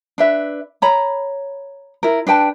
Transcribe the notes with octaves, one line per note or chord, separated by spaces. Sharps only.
D4 B4 E5
C#5 A#5 B5
E4 A#4
D4 B4 G5 A5